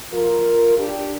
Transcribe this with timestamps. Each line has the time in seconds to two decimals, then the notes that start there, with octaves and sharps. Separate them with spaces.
0.11 A#2 F3 F4 A#4
0.78 D4 G4